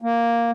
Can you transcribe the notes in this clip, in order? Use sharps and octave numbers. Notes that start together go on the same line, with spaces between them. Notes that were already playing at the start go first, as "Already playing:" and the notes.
A#3